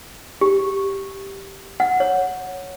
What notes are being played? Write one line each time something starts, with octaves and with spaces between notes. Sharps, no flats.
G4
F#5
C#5